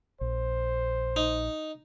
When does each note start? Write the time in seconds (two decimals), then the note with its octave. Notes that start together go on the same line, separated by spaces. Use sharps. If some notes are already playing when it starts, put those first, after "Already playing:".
0.21 A#1 C5
1.16 D#4